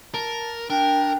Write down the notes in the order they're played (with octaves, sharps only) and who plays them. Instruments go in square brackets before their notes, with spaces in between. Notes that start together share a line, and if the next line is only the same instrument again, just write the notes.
[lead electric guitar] A#4 [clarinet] A5
[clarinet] D4 [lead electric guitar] A#4 [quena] G5